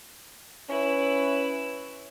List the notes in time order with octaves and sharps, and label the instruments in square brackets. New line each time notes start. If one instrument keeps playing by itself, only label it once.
[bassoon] C#4 [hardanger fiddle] E4 B4